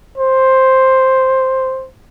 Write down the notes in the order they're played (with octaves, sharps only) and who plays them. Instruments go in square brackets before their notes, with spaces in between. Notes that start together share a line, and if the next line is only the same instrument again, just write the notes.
[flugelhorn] C5